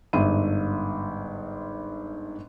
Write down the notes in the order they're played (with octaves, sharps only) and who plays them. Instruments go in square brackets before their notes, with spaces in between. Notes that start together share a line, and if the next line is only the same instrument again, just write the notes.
[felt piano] G1 G#2 E5 D#7